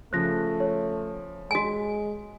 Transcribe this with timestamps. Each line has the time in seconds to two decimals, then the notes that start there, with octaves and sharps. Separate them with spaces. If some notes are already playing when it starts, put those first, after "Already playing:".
0.13 C#3 F3 A3 C5 F#6 A#6
0.60 C#5
1.51 G#3 F#4 G#5